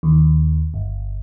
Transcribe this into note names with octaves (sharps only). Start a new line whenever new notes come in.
D#2
G1